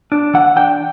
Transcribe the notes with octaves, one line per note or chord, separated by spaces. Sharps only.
D4
E3 F#5
D4 G5